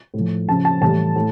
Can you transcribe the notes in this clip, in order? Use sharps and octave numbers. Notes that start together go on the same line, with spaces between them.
A2
F3
C#3 F3 A5
A5
A2 E3 G3 A5
A2